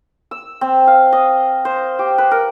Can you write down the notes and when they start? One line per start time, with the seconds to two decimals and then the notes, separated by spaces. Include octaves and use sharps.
0.31 E6
0.61 C4
0.87 F5
1.13 D#5
1.65 C5
1.99 G4
2.18 B4
2.31 A#4